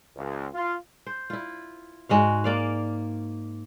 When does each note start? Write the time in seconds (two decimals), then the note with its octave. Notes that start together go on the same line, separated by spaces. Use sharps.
0.17 C#2
0.54 F4
1.06 C5
1.30 E4 F4
2.09 G#2 G#3 F#4 F5 C#6
2.44 A#3 D5 F5